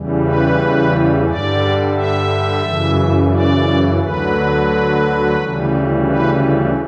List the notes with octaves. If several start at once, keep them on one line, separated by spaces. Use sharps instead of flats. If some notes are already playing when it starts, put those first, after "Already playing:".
Already playing: E2 C#3 E3 G3
B4
G2 D3 G3 D5
E5
F#2 C#3 E3
D5
D2 D3 F#3 B4
D2 C#3 E3 G3
B4